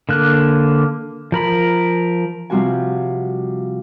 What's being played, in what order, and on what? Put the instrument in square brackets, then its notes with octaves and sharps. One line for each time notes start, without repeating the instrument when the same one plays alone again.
[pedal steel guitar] D3 A#3 F#6
F3 A#4 B5
[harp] C3 F3 G3 F4 F#4 G#5